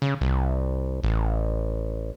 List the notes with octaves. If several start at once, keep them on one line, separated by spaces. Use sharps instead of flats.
C#3
C2
A1